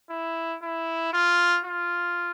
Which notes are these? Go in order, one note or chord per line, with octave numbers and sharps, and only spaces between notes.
E4
E4
F4
F4